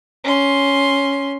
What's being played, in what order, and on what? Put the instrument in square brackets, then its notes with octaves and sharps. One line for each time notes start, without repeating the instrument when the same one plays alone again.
[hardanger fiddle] C#4 C6